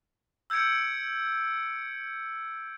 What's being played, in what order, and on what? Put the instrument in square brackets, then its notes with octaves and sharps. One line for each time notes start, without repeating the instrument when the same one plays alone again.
[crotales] E6 G6 G#6 C#7 D7